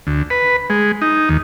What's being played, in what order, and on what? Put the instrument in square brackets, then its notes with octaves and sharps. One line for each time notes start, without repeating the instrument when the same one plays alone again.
[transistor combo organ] D2
B4
G#3
D#4
D#2